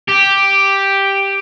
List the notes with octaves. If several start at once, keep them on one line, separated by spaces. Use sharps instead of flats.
G4